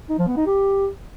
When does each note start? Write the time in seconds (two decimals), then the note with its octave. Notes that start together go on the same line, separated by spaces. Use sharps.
0.09 D#4
0.18 F3
0.27 B3
0.37 D#4
0.46 G4